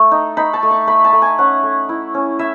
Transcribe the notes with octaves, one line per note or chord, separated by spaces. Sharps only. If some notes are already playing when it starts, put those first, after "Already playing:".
Already playing: A3
D#4
D#4 B5
A5
A3
C#6
A3 B5
A5
A3
G#5
C#4 F#5
A3
E4
C#4
E4 E5